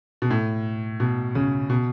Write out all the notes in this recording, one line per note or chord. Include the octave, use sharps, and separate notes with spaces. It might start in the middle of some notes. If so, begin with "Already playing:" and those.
B2
A2
B2
C#3
B2